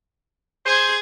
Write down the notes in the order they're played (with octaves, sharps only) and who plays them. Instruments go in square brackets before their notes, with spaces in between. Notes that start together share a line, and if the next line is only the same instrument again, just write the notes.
[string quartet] G#4 G#6 [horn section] C5